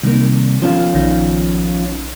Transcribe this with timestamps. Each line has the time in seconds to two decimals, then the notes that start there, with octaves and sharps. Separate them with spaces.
0.03 C2 D#3 A#3
0.62 F3 C#4 F4
0.94 A#1 D#3